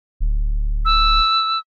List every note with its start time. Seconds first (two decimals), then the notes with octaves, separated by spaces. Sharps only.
0.20 D1
0.85 E6